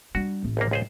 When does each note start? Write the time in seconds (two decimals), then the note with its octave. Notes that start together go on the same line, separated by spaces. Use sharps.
0.15 G3 D4 F#4
0.44 A1
0.57 A#1 D#2 A#3
0.71 C#2 G#4 C5